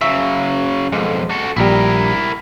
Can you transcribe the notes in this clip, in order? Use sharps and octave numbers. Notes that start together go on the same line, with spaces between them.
C#3 F#3 E5
B1 F2 G#3
F#4 A4
A#1 G3 E4 A#4